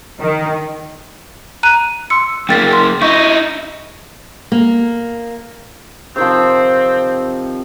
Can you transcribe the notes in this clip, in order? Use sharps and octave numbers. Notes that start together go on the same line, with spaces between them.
D#3
A#5 F#6 D#7
C6 E6 C#7
F#2 A#3 G5 A6 B6
C6
D#4 E4 C#6 G6
A#3
C3 D#3 F3 C4